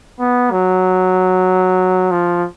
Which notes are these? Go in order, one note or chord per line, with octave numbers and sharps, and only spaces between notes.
B3
F#3
F3